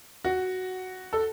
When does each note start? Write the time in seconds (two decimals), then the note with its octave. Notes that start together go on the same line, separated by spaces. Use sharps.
0.24 F#4
1.13 A4